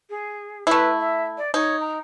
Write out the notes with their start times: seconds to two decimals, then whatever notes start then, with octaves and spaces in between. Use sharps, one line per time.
0.09 G#4
0.67 A3 E4 B4
0.99 E5
1.37 D5
1.54 D#4 C#5
1.80 A#5